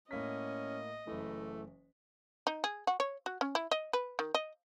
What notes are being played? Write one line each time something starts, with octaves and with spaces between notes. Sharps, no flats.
A2 A#3 C#4 D#5 B6
F#1 E3 A3
D#4
G#4
F#4
C#5
F#4
C#4
E4
D#5
B4
D#3
D#5